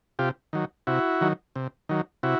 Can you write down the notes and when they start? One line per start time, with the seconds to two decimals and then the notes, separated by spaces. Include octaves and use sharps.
0.19 C3 F4 G4
0.53 D#3 F#3
0.87 C3 E4 F#4
1.21 D#3 F#3
1.56 C3
1.89 D#3 F#3
2.23 C3 E4 F#4